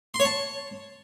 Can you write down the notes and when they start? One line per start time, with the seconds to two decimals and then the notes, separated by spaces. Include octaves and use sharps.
0.14 C6
0.20 C#5
0.25 A5